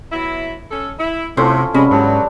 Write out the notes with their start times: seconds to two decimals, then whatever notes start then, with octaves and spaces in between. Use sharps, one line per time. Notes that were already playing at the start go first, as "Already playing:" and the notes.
0.12 F#3 B3 E4
0.71 C#4 A4
0.99 E4
1.37 A2 C3 C#4 F4 A4 C5
1.74 C3 G3 G#3 B3 C#4
1.91 E2 G#2 E3 F#3 D4